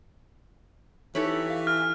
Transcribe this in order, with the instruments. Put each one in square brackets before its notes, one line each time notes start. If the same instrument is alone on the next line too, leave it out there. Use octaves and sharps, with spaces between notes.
[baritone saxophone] E3 [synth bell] D#4 B6 F#7 [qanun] G4 A4 C#5
[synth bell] F5
[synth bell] E4 [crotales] F6